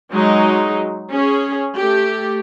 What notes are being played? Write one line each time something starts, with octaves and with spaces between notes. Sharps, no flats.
F#3 G#3 D#4
C#4 G#4
A3 G4